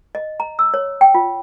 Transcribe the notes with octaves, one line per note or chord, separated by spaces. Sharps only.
D#5
A#5
E6
C#5
G5
F4